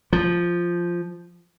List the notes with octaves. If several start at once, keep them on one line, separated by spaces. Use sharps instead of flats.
F3